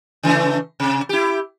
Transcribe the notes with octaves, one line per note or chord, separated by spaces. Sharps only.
C#3 E3 A3
C3
E4 G4